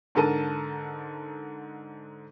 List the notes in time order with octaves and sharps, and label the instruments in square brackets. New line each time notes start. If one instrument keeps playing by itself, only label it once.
[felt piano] G#2 D3 A4 A#4 A5 D#7